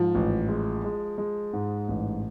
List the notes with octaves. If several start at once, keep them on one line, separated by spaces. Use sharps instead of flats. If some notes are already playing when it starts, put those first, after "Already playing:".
Already playing: G#2 F3
A1
G#3
G#3
G#3
G#2
A1